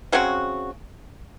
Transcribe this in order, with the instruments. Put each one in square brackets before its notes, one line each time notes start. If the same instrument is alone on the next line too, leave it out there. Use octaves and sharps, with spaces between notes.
[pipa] C#3 F#3 C4 F#4